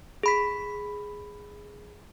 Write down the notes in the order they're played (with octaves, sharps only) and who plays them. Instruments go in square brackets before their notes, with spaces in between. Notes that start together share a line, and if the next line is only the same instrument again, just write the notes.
[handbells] G#4 B5 B6